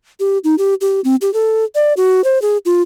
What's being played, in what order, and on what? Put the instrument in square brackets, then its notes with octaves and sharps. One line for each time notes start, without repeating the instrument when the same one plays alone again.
[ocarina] G4
D#4
G4
G4
C4
G4
A4
D5
F#4
C5
G#4
F4